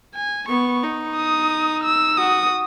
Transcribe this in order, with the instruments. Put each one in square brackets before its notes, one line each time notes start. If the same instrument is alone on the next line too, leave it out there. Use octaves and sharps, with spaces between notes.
[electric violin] G#5
[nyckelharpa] B3 [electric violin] C#6
[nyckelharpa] D#4
[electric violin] D#6
E6
[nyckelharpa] F#4 [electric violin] D#6